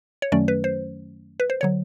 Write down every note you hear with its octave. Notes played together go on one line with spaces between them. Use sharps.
C#5
F#2 D#3 F#3 A3 C#4 D5
B4
C5
B4
C5
D3 F#3 C#5